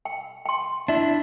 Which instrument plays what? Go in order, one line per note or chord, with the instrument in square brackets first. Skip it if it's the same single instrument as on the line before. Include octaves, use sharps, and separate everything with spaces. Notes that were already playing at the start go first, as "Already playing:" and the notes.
[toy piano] G5
G5 C6
[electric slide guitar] D4 E4 [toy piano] E5